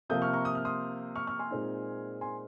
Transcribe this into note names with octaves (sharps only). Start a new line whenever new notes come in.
C3 F3 A#3 D#6 G6
C#6 F6
A#5 C#6
D#6
F6
C6 D#6
C#6 F6
C#6 F6
G#5 C6
A#2 G#3 C4 D#4
G#5 C6